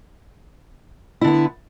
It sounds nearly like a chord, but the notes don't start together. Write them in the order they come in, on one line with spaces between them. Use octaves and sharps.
E4 D3 B3